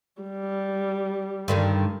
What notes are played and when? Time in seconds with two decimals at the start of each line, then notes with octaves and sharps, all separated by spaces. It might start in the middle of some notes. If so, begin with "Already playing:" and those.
0.22 G3
1.48 G2 D3 D#3